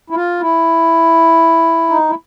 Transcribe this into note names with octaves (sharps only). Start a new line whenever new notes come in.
E4
F4
E4
D#4
E4